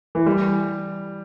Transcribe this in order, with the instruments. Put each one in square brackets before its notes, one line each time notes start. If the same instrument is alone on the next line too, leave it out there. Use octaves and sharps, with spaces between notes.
[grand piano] E3
G3